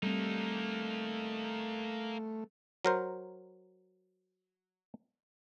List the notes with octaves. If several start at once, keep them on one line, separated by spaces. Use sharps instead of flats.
G3 A3 A#3 C4 D#4
F#3 A#4 C5